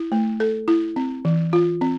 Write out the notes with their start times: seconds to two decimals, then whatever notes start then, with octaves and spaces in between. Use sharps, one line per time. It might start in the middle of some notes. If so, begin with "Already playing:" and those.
Already playing: E4
0.12 A3
0.40 A4
0.68 E4
0.96 C4
1.25 E3
1.53 F4
1.81 C4